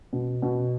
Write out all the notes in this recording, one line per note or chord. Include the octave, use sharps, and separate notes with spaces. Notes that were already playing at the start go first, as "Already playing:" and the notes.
B2
B2